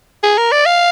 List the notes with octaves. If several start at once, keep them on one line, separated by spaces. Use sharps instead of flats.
G#4
A#4
D5
F5